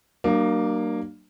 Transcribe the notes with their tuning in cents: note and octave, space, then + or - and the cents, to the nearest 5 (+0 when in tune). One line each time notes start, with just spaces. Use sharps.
F#3 +45 A#3 +0 D4 +45